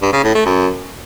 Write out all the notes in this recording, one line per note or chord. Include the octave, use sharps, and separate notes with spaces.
G2
C#3
A2
A3
F#2